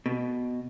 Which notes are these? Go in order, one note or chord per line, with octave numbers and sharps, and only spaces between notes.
B2